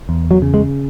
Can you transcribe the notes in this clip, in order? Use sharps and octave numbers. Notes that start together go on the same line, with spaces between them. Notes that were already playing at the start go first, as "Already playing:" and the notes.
E2
F#3
C#3
G#3